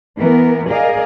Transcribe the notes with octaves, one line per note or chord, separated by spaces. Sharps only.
E3 B3 A#4
G#4 A#4 D5 D#5 F5